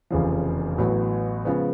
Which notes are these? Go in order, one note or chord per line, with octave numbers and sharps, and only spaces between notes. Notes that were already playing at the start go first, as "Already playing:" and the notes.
F1 E2 C#3 F3
A1 A2 F#3 B3
C#3 F3 G#3 B3